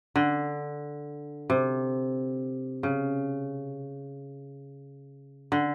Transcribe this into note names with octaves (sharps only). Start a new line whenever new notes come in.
D3
C3
C#3
D3